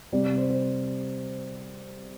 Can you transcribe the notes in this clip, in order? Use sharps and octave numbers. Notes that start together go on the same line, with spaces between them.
C3 G3 D5
D5
C5
C5